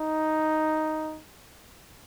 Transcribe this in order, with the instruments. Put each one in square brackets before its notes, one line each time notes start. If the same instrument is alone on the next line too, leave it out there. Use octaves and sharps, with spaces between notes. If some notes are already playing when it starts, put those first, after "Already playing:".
Already playing: [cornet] D#4